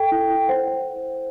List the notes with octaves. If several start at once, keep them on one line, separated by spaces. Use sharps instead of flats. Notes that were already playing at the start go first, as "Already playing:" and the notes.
Already playing: A4 G5
E4
E4
C5 F#5
C5